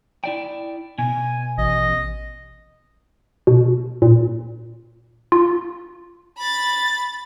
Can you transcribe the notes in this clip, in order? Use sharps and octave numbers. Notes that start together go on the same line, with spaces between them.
E4 D5 G5
B2 G#5
A1 D#5
B2
A#2
F4
B5 A6